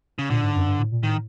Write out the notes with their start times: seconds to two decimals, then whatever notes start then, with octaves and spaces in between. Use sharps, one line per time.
0.19 C#3
0.30 A#2 D3
0.43 G#2
0.55 F#2
0.67 G2
0.78 A2
0.92 A#2
1.03 A2 D#3